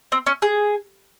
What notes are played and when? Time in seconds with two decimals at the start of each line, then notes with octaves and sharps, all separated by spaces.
0.12 C4
0.26 C#4
0.42 G#4